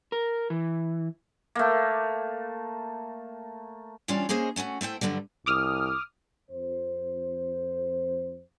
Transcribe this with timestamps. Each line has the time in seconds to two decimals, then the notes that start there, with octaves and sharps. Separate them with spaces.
0.12 A#4
0.50 E3
1.55 A3 A#3
4.08 E3 G3 C#4 D4 F4 C#5
4.29 A#3 C#4 G#4 C5 D#5
4.56 A3 C#4 F4 F#4
4.81 A3 E4 C5 G5
5.01 G2 B2 D3 F#3 G3
5.46 C2 D6 D#6 F6
6.50 F2 C5